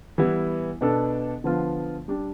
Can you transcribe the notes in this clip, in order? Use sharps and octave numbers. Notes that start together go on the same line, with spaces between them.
E3 G3 B3 E4
B2 B3 D4 A4
D3 F3 B3 F4
G3 D4 G4